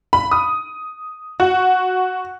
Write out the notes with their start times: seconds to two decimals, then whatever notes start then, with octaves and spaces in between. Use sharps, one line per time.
0.13 B5
0.31 D#6
1.40 F#4